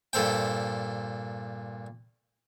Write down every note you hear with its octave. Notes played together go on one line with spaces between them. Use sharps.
G2 A#2 A4 C5 G5